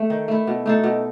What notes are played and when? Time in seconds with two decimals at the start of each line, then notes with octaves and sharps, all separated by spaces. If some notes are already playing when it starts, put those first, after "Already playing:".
Already playing: A3
0.10 D#3
0.28 A3 E4
0.47 B2
0.66 A3 D#4 A4
0.84 B2